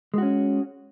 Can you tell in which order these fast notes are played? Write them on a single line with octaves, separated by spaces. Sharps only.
G#3 F#4 C#4